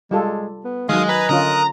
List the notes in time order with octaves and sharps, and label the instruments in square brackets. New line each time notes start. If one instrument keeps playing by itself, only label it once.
[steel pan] G3 F4 A4 [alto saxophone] G#3
[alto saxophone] B3
[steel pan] D#3 F#3 [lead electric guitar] G#3 [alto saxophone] D#5 [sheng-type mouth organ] F5 D#6
[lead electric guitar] B4 [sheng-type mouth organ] G#5 A#5
[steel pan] D3 C#4 F4 [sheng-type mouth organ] A#4 D#6 F#6 [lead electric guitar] A#5